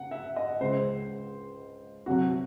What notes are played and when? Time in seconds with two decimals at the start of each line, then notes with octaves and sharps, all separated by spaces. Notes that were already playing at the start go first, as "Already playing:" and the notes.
Already playing: C#3 F#5
0.11 E5
0.36 D#5
0.60 C#2 C#3 G#3 C5
2.06 C2 C3 F#3 F#4